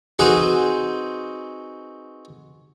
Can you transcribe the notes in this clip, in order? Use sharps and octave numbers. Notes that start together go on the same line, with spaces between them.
C4 D#4 F#4 G#4 B4 C5